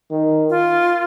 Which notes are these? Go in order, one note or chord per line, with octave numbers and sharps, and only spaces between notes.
D#3
F4